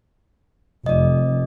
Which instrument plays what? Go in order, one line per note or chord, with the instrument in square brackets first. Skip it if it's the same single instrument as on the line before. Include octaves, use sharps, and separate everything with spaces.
[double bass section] F1 [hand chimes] D5 D#5